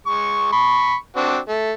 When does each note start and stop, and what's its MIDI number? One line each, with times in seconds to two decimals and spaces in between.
0.07 0.52 56
0.07 0.52 85
0.52 0.94 83
0.52 0.94 85
1.17 1.37 60
1.17 1.37 62
1.17 1.37 66
1.49 1.71 57